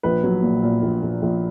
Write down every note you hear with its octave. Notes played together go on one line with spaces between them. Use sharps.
A#1 B4
F#3
A#2
A#2
A#1
A#1
A#1